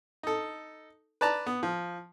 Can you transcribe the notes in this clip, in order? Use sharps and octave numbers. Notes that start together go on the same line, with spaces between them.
D#4 A4
B4 D5 A5 A#5
B3
F3